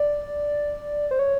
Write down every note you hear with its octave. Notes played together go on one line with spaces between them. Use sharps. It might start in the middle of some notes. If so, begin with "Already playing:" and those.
Already playing: D5
C5
C#5